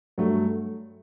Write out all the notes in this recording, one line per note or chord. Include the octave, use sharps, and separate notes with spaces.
G2 F#3 A3